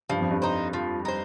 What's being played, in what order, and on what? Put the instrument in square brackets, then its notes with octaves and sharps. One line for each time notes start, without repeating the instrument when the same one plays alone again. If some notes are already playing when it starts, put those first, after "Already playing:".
[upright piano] G2 [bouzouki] F3
[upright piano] F2
G2
[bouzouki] D#4 C5
F3
D#4 C5